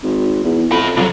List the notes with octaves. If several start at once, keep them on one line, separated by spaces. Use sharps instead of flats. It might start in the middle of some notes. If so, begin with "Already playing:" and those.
G#1
E2
F2 A4 B5
B1 F2 F#3